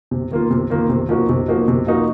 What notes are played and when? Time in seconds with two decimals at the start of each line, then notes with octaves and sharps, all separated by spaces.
0.11 C3
0.31 D#3 A#3 F4
0.50 C3
0.70 D#3 A#3 F4
0.90 C3
1.09 F3 A#3 D#4 F#4
1.29 C3
1.48 F3 A#3 D#4 F#4
1.68 C3
1.87 F3 A#3 D#4 F#4